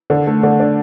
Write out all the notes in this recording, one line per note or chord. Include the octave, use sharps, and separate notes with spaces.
D3
A3
D3
D4